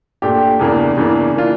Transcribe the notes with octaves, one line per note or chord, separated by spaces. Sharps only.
A#2 A3 D4 G4
E2 C#3 E3 A#3 D4
E2 C#3 E3 A#3 D4
E3 A#3 D4 F4